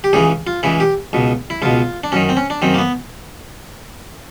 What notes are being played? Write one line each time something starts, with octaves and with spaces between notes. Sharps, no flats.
G4
C#2 C#3 E3 G#4
F4
C#2 C#3 E3 E4
G4
C#2 B2
E4
C#2 B2 F4
D4
F#2 D#3 C#4
C4
C#4
D4
F#2 D#3 C4
A#3
B3